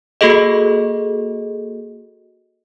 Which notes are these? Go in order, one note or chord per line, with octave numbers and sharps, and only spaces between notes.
A#3 F#4 G#4 A4 D#5